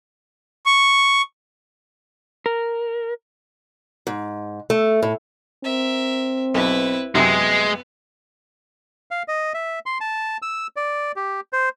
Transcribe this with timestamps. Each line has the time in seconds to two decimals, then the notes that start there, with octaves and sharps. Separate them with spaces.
0.66 C#6
2.46 A#4
4.07 G#2
4.70 A3
5.03 A2
5.64 C4 A#4 E5
6.54 B1 E4 B4
7.15 F#2 C3 G#3 B3
9.11 F5
9.28 D#5
9.54 E5
9.86 C6
10.01 A5
10.42 E6
10.76 D5
11.16 G4
11.53 C5